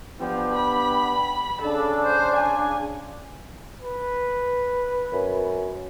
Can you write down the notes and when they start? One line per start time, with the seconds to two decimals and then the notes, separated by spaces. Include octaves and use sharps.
0.20 F3 B3 D4 G4
0.55 B5
1.62 C#3 D4 A4
2.04 C5
2.36 G#5
3.82 B4
5.13 F#2